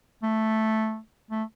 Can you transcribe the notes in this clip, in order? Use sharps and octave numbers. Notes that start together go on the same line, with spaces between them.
A3
A3